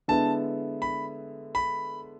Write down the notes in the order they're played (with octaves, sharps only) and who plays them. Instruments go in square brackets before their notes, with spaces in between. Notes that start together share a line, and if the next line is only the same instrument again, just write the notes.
[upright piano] D3 G#3 B3 E4 [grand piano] A5
[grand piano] B5
B5